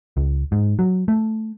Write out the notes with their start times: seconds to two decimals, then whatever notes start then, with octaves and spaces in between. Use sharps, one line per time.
0.17 C#2
0.52 G#2
0.79 F#3
1.08 A3